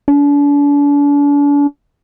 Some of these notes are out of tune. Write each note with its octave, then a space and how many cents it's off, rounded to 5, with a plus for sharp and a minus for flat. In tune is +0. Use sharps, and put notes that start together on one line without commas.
D4 -40